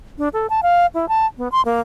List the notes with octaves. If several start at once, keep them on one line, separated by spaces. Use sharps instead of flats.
D4
A4
A5
F5
E4
A5
B3
C6
A#3